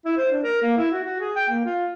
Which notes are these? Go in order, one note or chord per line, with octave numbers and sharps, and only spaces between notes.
E4
C5
D4
A#4
A#3
E4
F#4
F#4
G#4
G5
A#3
F4